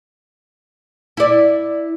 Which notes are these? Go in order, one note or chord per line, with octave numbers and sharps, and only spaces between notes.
E4 D5